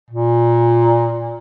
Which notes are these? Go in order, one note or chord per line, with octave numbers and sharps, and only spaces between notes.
A#2